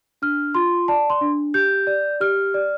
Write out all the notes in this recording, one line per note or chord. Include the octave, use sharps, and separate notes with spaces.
D4 F6
F4 C6
D5 A5
C6
D4
G4 G6
D5
G4 F6
D5